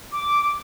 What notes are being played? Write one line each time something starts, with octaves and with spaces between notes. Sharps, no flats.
D6